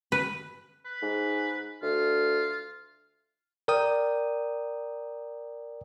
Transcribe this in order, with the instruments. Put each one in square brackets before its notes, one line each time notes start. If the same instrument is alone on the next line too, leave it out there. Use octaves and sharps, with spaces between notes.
[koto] B4
[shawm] B4
[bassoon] G#2
[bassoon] D2 [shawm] F4
[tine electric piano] A#4 D5 G5 D#6